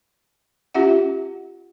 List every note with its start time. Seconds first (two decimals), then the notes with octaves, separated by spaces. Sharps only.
0.74 C#4 F4 G4 E5 F#5